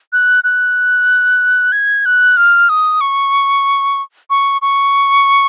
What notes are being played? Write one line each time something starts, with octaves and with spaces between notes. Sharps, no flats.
F#6
F#6
G#6
F#6
F6
D#6
C#6
C#6
C#6